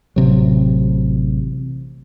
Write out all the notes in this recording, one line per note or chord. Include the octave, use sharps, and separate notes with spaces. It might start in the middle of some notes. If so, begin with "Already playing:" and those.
A1 C3 F#3